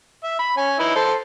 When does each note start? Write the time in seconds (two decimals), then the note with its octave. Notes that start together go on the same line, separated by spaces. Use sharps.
0.24 E5
0.39 B5
0.58 C#4 G#5
0.79 D#4 E4 B4
0.96 A4 C5